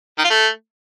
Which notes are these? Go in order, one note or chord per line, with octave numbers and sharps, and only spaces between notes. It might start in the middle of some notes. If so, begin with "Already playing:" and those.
D#3
F4
A3